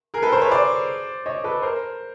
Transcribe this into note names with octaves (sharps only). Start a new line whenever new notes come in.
G#4 A#4
A4 B4
A#4 C5
B4 C#5
C5 D5
C#5 D#5
A4 B4
A#4 C5